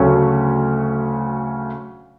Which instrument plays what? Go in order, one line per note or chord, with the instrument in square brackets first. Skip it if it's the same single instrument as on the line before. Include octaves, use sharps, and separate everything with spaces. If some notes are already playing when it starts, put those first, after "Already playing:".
Already playing: [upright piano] D2 C#3 F#3 A3 C#4